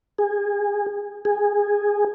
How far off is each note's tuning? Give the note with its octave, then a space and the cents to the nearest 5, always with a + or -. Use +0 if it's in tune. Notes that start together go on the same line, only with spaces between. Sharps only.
G#4 -25
G#4 -15